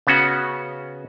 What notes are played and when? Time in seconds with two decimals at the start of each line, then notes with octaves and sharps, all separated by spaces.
0.07 C#3 B3 C#4 F#4